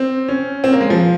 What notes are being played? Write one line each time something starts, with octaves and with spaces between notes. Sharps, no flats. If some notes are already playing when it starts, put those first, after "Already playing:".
Already playing: C4
C#4
C4
A#3
G#3
F3